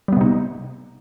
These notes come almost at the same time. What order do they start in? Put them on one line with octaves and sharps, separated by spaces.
G3 B3 C3 D#4